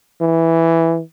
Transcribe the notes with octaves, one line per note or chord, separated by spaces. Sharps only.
E3